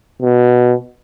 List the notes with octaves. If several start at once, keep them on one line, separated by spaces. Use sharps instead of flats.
B2